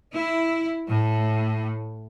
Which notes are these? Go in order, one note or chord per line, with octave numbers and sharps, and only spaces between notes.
E4
A2